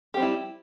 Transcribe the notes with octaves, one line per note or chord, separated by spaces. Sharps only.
G3 C4 E4 G4